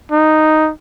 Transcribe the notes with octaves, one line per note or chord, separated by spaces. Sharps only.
D#4